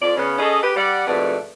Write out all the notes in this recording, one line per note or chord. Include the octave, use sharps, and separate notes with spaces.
F2 D5
C#3 B3 C#4
C#4 G#4 A4 D#5
G4 B4
G3 D5 F#5
F2 G#2 B2 A3 B4 D5